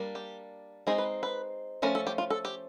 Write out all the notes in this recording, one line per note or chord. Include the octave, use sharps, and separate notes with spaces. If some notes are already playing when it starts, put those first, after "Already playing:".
Already playing: G3 A#3 D4
G4
G#3 C4 D#4 G#4
B4
B4
F3 A3 C#4 A#4
A4
G4
F4
A4
G4